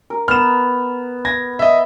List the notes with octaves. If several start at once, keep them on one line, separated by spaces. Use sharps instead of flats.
A#4
B3 F6 E7
G#6 A#6
D#5 E5